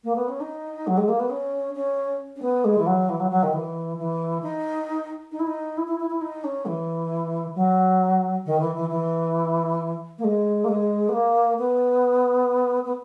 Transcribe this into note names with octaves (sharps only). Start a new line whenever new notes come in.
A#3
B3
C#4
D#4
F#3
G#3
A#3
B3
C#4
C#4
C#4
B3
G#3
E3
F#3
E3
F#3
F#3
D#3
E3
E3
D#4
D#4
E4
D#4
E4
E4
E4
E4
D#4
C#4
E3
F#3
D#3
E3
E3
E3
A#3
G#3
A#3
G#3
B3
A#3
B3
B3